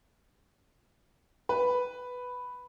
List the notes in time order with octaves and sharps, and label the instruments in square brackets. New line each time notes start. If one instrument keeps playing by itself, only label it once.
[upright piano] B4